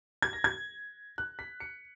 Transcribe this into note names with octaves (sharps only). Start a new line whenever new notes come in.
G#6
A#6
G#6
F#6
B6
C#7